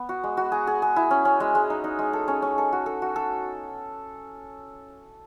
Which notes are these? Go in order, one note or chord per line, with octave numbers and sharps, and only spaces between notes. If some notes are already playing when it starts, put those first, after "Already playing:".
Already playing: B3
F#4
G#3
F#4
G#4
G#4
G#4
E4
C#4
C#4
G#3
G#3
D#4
D#4
G#3
A4
C#4
C#4
A4
F#4
A4
F#4
A4